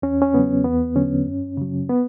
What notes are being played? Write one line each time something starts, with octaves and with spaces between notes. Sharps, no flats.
E2 C#4
C#4
C#3 F#3 B3
E2 B3
D3 F#3 C#4
F#2
C#3 F#3
B3